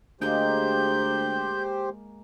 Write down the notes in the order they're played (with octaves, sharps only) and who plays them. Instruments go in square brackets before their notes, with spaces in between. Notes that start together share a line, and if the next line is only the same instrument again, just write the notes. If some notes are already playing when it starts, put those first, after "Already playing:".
[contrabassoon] D2 [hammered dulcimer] G#3 A#3 A#4 [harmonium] G4 C5 [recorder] G6